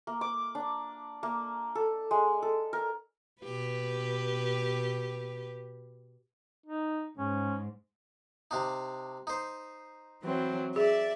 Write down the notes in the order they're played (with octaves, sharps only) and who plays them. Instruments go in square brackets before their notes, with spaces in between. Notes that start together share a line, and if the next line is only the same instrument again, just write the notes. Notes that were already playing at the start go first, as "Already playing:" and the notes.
[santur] A#3
D6
D4
A#3
A4
G#3
A4
A#4
[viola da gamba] B2 G4 B4
[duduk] D#4
[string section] G#2 [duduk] C#4
[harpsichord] C3 D4 D#4
D#4 C5
[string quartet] E3 F#3 C4
[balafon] G#4 [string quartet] D5 E5